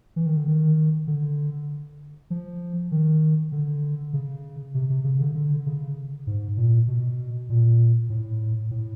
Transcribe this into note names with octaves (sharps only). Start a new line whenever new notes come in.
E3
D#3
D3
D#3
D3
F3
D#3
D3
C#3
C3
C3
C#3
D3
D3
C#3
G#2
A#2
B2
A#2
A2
A2